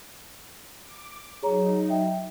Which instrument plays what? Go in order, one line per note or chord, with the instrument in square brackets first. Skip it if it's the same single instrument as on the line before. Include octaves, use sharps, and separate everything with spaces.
[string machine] D6
[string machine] F#3 D#4 [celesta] G#4 C#5 A#5
[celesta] E5 G5